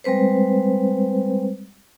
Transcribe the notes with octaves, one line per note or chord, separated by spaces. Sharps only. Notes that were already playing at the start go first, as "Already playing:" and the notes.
G3 G#3 C4 B4 C5